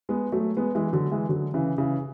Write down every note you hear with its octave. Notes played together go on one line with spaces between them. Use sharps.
G#3 B3
F#3 A3
G#3 B3
E3 G#3
D3 F#3
E3 G#3
D3 F#3
C#3 E3
C#3 E3